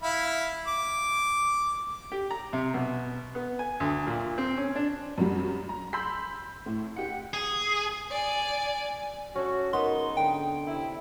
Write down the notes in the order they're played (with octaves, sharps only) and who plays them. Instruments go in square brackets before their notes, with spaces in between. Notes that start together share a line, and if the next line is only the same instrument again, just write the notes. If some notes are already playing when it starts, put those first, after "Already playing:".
[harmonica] E4 F5 B5
D6
[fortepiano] G4
A#5
C3
B2
B3
G#5
D2
A#2
C4
C#4
D4
[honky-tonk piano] F#2 F#3 G3
A#5
B5 C6 E6 G6 B6
A2
G4 F#5
[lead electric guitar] G#4
[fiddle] D5 G#5
[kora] C#4 A4 [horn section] F#4
[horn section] G#2 D#4 [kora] B3 [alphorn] A#4 [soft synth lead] C6
[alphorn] D3 [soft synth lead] G5
[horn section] C3 E4